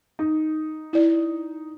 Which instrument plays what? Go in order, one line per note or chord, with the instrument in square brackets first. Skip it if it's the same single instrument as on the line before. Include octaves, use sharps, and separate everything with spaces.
[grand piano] D#4
[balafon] E4 D5